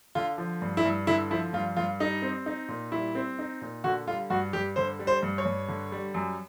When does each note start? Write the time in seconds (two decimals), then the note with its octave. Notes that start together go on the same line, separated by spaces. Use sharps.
0.15 D3 F4
0.38 F3
0.62 G2
0.77 E4
0.85 G2
1.07 D3 E4
1.31 F3 E4
1.53 G2 F4
1.76 G2 F4
2.00 G3 D#4
2.22 C4
2.46 D#4
2.68 A#2
2.92 G3 E4
3.15 C4
3.39 D#4
3.61 A#2
3.84 D3 F#4
4.07 G3 F4
4.30 G2 F#4
4.53 G2 G4
4.76 D3 C5
4.99 G3
5.07 C5
5.23 G2
5.38 C#5
5.45 G2
5.68 D3
5.92 G3
6.14 F#2